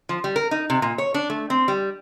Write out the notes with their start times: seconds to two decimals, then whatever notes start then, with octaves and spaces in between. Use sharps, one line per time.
0.09 F3
0.24 G3
0.36 A#4
0.51 D#4
0.70 C3
0.82 A#2
0.98 C#5
1.14 D4
1.30 A3
1.50 C4
1.68 G3